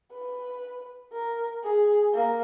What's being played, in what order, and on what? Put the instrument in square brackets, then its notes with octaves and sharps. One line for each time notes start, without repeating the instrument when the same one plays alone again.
[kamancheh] B4
A#4
G#4
A#3